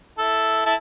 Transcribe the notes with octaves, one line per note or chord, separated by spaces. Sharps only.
E4 A4
E4 A4 A5